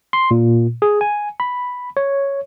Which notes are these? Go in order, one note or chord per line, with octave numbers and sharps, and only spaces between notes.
C6
A#2
G#4
G#5
B5
C#5